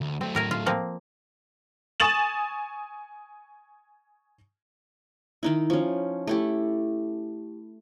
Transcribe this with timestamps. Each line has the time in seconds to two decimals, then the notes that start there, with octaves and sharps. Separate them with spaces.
0.01 D2
0.21 F#3 A3 C4
0.35 A2 A#4 G#5
0.51 F4
0.66 F3 A#3 C4
2.00 G#5 C#6 D#6 A6 E7 F#7
5.43 D#3 D#4 E4
5.70 F3 C#4
6.27 A3 E4 G4